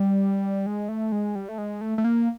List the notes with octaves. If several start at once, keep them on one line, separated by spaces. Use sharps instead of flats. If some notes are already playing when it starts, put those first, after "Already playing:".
Already playing: G3
G#3
A3
G#3
G3
A3
G#3
A3
A3
A#3